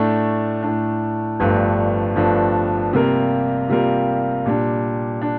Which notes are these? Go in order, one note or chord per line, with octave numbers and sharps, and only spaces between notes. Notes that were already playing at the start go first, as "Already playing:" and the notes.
Already playing: A2 A3 D4
A2 A3 D4
G1 G2 F3 A3 D4
G1 G2 F3 A3 D4
C3 G3 A#3 F4 A#4
C3 G3 A#3 F4 A#4
A#2 G3 D4
D4